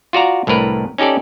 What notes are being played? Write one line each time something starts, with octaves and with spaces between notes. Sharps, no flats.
F4 F#4 D5 A#5
C2 A2 D4 A#4 B4
C#4 D#4 G4 A4 D5